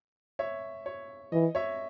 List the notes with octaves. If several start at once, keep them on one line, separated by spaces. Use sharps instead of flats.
C#5 E5
C#5
E3 D#5
C#5 E5